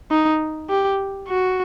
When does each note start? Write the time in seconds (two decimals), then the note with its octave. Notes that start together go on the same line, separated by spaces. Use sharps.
0.11 D#4
0.70 G4
1.29 F#4